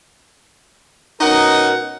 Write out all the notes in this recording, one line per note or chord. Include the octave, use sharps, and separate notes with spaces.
B2 C#4 D#4 A#4 D#5 F#5